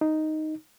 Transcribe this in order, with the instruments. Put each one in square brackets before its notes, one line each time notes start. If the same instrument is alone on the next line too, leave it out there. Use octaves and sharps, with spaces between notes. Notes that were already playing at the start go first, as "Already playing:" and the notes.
[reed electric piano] D#4